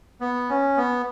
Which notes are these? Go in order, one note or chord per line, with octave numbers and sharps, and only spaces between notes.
B3
C#4
B3